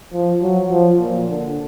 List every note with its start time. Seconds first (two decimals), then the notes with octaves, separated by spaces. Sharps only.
0.13 F3
0.42 F#3
0.71 F3
1.00 A#2
1.29 D3